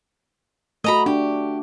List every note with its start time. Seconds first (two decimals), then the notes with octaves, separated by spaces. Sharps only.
0.84 A3 F#4 D#5 A#5 B5
1.06 D4 G4